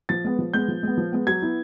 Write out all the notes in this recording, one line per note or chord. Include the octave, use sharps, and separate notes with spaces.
F3 A6
G#3 B3
F3
G#3 B3 G6
F3
G#3 B3
F3
G#3 B3
F#3 G#6
B3 E4